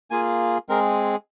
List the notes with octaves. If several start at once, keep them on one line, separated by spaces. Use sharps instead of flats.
A#3 F4 G#4 G#5
G#3 C4 G#4 A#4